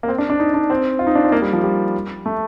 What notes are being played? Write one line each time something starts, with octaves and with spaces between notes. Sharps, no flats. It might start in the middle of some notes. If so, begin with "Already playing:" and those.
A#3
C4
D4
D4
D#4
D4
C4
F4
D#4
D4
C4
A#3
G3
F3
G3
A3